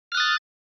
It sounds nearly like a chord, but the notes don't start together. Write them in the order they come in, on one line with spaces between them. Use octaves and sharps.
F6 F#6 D#6 A6